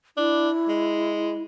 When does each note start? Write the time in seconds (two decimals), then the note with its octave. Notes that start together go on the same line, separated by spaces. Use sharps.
0.17 D4 E4
0.68 G#3